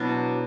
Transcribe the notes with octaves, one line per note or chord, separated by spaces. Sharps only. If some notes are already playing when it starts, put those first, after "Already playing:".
Already playing: B2 F#3 B3 D4 E4 B4